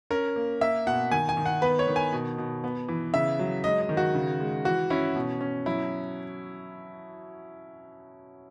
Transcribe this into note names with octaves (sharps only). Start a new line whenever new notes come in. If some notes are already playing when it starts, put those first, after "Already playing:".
C#4 A#4
A#3
A#3 E5
B2 F#5
D#3 G#5
G#5
D#3
F#5
B3 B4
C#5
D#3
G#5
B2
B2
B3
E3
C#3 E5
F#3
G#3 D#5
D#5
D#3
F#4
C#3
G#3
E3 F#4
C#4 E4
B2
C#4
F#3 E4